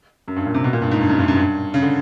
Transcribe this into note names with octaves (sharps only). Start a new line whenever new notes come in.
F#2
G2
A#2
C3
B2
A#2
G2
G#2
G2
F#2
G2
F#2
G2
C#3
D3